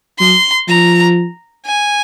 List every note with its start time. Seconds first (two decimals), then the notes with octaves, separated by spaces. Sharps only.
0.19 F#3 C6
0.68 F3 A#5
1.66 G#5